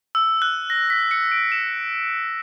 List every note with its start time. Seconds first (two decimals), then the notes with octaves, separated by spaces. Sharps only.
0.15 E6
0.42 F#6
0.70 A#6
0.90 B6
1.11 C#7
1.32 D7
1.52 E7